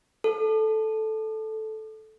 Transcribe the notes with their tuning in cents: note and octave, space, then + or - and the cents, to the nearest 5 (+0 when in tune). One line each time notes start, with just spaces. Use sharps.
A4 -5